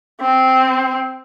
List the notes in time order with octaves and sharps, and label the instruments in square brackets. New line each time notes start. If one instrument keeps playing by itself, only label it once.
[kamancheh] C4